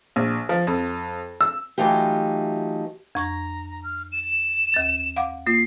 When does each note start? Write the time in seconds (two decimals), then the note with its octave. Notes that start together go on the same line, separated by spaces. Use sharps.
0.16 A#1
0.49 F3
0.67 F2
1.41 E6
1.78 E3 F#3 A3 D#4 F4 G4
3.15 F2 A#5 C#6 G#6
3.83 F6
4.12 E7
4.74 D#2 A6
5.16 F5 F#5 D6
5.47 A#3 F4 C7